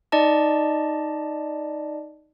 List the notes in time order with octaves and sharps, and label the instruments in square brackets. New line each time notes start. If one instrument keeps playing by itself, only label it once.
[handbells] D#4 D5 D#5 A5